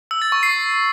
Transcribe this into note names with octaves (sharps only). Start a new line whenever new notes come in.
E6
A6
C#6
C7